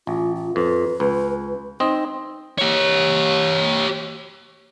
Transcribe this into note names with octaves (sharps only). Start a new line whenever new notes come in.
A1 F4
F4
F2 B4
C#2
C4 D#4 D#5
G4 C#5